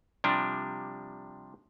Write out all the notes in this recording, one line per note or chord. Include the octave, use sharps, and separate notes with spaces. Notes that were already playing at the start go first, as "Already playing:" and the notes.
C3 F3 G3 D4